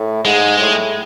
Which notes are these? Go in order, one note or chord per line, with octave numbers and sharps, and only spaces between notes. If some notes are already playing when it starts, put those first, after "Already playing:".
Already playing: A2
G#2 G#3
A2